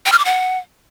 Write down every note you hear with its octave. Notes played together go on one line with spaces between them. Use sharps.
G5
F6
D6
F#5